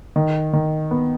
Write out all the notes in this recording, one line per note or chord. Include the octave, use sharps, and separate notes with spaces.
D#3
D#3
B3